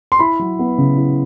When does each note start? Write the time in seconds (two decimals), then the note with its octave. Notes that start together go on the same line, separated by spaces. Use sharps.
0.12 C6
0.19 E4 B5
0.39 F#3
0.59 B3
0.78 C#3
0.97 E4